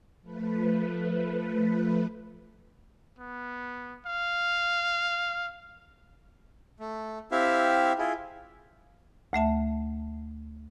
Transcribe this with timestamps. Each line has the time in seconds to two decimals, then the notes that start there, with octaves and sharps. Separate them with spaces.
0.21 F3 A3 B4
3.19 B3
4.06 F5
6.80 A3
7.32 C4 E4 G4 E5 F5
7.98 E4 F4 G#4
9.33 D2 A3 E5 A5